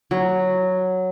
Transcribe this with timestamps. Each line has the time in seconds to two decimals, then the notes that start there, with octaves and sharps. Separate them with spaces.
0.11 F#3